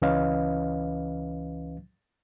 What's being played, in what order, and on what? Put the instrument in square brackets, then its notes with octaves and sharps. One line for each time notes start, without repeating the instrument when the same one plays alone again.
[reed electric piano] C#2 E3 C#4 B4 D#5 F5